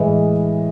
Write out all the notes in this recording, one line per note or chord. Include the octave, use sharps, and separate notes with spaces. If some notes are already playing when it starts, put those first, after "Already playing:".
Already playing: A2 E3 G#3 D#5